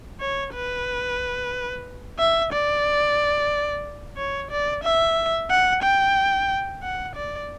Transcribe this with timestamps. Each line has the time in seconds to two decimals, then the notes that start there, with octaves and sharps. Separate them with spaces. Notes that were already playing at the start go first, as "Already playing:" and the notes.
0.20 C#5
0.54 B4
2.19 E5
2.53 D5
4.17 C#5
4.50 D5
4.83 E5
5.50 F#5
5.82 G5
6.83 F#5
7.15 D5